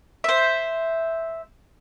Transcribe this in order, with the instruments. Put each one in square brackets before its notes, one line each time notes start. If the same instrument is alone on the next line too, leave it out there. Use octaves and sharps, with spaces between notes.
[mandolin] C5 E5